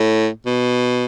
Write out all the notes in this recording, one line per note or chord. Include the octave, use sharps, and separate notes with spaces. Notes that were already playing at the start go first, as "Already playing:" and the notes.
Already playing: A2
B2